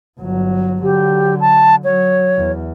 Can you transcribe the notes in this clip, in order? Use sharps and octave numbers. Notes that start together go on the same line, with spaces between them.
G1 F#3
D3 F#3 G4
A5
F#3 C#5
E2